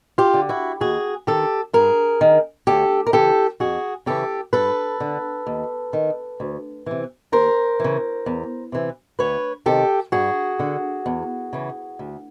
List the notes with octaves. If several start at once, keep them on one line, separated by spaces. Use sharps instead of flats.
F4 G4
D3
E4 F#4
D#2 F#4 G#4
D#3 G4 A4
G2 G#4 A#4
D#3
D2 G4 A4
A#4
C#3 E3 G4 A4
F2 F#4 G#4
C#3 E3 G4 A4
G2 A4 B4
D3
D#2
D#3
D2
C3 E3
D#2 A#4 C5
C#3 E3
E2
C3 E3
D2 B4 C#5
C3 D#3 G4 A4
G2 F#4 G#4
D3
E2
C#3 E3
D2